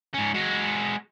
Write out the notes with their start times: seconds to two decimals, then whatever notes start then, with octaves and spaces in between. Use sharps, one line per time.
0.14 G#2 C#4
0.34 G#3 F#4